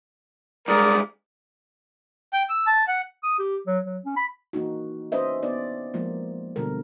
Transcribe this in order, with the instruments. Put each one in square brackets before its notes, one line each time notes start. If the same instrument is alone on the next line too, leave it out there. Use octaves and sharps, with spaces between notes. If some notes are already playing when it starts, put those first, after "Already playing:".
[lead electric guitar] G2 G#3 [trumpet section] A#4 D5 D#6
[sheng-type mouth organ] G5
E6
A5
F#5
[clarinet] D#6
G4
F#3
F#3
C#4
B5
[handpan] E3 A#3 D#4 F#4
C#4 B4 C5 D#5 E5
B3 D#4 D5
F3 G#3 A#3 F4
B2 D3 G3 A#4